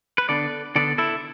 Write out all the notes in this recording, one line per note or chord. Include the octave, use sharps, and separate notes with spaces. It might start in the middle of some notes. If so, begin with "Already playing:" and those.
B4
D3 B3 D4 A4 D5
D3 B3 D4 A4 D5
E4 A4